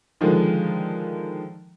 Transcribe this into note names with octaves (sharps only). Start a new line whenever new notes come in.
D3 D#3 F3 G#3